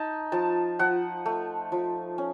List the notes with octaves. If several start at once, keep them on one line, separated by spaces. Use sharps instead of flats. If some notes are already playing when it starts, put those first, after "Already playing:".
Already playing: D#4 A5
F3 A5
F3 F#5
A3
F3
C#4